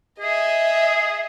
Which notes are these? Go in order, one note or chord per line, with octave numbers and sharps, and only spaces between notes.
G#4 D#5 E5